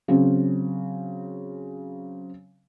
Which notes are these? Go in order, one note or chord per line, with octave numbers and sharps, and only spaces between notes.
C#3 F#3 C4